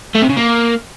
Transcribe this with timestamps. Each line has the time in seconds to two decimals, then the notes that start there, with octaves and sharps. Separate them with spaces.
0.15 A3
0.22 C3
0.30 C#3
0.37 A#3